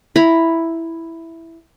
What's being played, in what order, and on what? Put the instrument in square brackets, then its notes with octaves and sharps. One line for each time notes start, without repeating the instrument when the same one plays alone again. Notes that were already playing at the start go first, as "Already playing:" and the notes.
[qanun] E4 A#5 B5